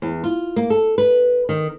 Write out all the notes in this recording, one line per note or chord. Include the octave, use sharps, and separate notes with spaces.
E2
F4
A#3
A4
B4
D#3